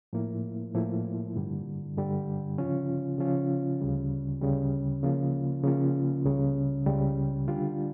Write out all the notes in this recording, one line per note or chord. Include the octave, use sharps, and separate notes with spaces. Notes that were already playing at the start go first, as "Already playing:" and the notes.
A2 F3 A#3 E4
A2 F3 A#3 E4
G2 D3 G3
G2 D3 G3
C#3 F3 C#4 F4
C#3 F3 C#4 F4
D2 C#3 G3
D2 C#3 G3
C#3 F3 A#3 C#4 F4
C#3 F3 A#3 C#4 F4
C#2 C#3 G3
C#2 C#3 G3
D3 G3 D4 F4